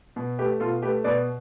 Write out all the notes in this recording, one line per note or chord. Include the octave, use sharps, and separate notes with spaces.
B2
A3 G4 B4
B2 F4 A4
A3 G4 B4
B2 B4 D5